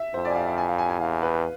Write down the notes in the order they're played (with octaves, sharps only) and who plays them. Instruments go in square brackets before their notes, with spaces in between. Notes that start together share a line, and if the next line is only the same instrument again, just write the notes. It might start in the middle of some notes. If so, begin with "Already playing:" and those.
Already playing: [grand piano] E5
[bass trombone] F2 [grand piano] C5
[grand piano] D5
G#5
F5
F5
G#5
F5
G#5
G#5
[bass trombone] E2 [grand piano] F5
[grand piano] B4